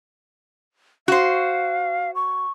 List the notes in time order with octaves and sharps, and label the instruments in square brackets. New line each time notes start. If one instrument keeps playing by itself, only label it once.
[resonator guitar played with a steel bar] F#4 C5 [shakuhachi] F5
[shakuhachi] C#6